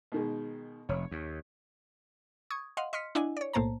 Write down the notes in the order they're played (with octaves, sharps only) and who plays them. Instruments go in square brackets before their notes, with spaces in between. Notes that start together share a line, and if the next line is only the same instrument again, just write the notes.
[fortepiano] B2 D#3 G#3
[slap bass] F1 [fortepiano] C#5
[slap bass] D#2
[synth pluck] C#6 D#6 G#6
D#5 F5 F#5 C6
D#5 C6 F6 B6 C#7
D4 E4 D#5 F#5 G#5
C#5 D5
B1 A2 A#3 C5 A5 A#5